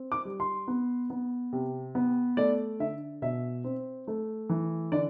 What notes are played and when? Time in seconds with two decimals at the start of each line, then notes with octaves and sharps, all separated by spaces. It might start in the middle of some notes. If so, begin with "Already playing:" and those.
Already playing: C4
0.12 D6
0.25 G3
0.40 C6
0.68 B3
1.10 B3
1.53 C3
1.95 B3
2.37 A3 D5
2.80 D3 E5
3.22 B2 E5
3.64 C4
4.07 A3
4.49 E3
4.92 D3 D5